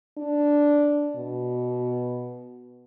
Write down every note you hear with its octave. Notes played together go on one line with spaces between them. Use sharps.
D4
B2